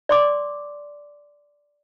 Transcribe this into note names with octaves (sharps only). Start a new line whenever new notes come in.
D5 C6 D6